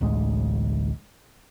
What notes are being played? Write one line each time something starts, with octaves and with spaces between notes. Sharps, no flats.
D1 A1 D2 G#3